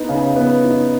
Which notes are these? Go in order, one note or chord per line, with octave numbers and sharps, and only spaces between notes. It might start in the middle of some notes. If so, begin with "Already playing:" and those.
Already playing: B3 D#4
C#3
B3
D#4